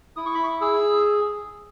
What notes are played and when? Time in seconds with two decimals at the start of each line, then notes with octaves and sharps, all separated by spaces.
0.16 E4 D#6
0.26 C#6
0.34 B5
0.44 C#6
0.61 G#4 E6